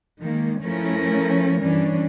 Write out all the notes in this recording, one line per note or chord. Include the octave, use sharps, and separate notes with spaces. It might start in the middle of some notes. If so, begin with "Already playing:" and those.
D#3 G#3 A#3
F3 A3 C#4 E4 A#4
G2 E3 C#4 D4